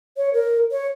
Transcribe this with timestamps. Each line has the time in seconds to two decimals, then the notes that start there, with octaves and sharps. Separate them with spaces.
0.17 C#5
0.34 A#4
0.71 C#5